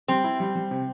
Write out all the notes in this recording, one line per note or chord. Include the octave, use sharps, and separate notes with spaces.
G3 C4
E4
G3
G3
C3